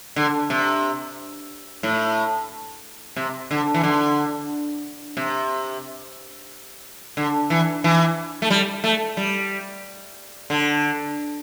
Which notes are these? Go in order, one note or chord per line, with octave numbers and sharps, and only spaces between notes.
D3
C3
A2
C3
D3
E3
D3
C3
D3
E3
E3
A3
G3
A3
G3
D3